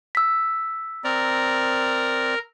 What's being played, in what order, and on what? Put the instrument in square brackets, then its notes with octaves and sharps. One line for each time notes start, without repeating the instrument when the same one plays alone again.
[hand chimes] E6 B6
[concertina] C4 D5 [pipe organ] A#4